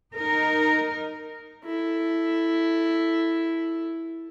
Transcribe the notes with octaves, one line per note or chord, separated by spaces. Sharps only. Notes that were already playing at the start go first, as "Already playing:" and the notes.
D#4 A#4
E4 A4